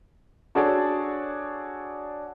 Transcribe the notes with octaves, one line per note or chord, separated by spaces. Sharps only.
D4 F#4 G#4 A4 C#5 D5